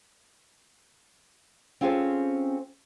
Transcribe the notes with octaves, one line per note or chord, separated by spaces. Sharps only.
C4 C#4 F4 G#4 A4 C5